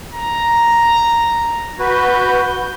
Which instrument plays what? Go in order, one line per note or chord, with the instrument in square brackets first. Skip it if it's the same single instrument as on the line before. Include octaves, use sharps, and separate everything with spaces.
[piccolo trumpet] A#5
[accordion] F#4 B4 [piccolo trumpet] G6